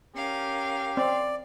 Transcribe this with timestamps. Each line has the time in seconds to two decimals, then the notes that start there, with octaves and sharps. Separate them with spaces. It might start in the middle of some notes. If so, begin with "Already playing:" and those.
0.16 C#4 G4 A#4 F5
0.97 C4 D5